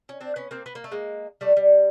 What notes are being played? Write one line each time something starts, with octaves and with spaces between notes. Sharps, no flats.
C#4
C4 D4
B3 C#4
A#3 C4
B3
A#3
A3
G#3 A#3
G3 A3
G3